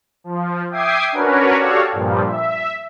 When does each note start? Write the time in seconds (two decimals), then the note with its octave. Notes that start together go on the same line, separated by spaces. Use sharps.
0.24 F3
0.70 E5 G5 D6 D#6 G#6 C7
1.12 C#4 D4 F#4 A#4 B4 C#5
1.57 F#4 G4 A4 C#5 D5 F5
1.92 G2 A#2 F3 G3
2.26 E5